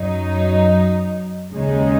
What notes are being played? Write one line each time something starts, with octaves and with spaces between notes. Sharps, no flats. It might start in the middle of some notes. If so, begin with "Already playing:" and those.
Already playing: F#2 F#3 D#4
D#2 C#3 G#3 D#4